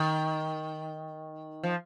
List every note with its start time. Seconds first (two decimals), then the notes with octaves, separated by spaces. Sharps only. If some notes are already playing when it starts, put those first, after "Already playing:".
Already playing: D#3
1.63 F3